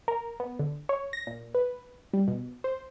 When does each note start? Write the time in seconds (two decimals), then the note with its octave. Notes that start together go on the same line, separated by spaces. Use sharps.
0.08 A#4
0.40 B3
0.59 D3
0.89 C#5
1.13 A#6
1.27 A#2
1.54 B4
2.13 G3
2.28 B2
2.64 C5